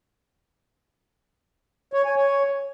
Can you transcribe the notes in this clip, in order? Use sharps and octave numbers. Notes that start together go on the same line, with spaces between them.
C#5
G#5
C#5